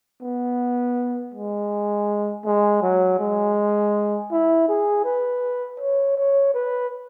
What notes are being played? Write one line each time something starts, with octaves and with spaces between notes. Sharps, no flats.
B3
G#3
G#3
F#3
G#3
E4
G#4
B4
C#5
C#5
B4